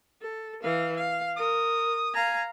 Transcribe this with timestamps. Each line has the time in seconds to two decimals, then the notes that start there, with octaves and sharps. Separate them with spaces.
0.21 A4
0.63 E3 F5
0.97 F5
1.37 A#4 D#6
2.14 F5 G#5 A#5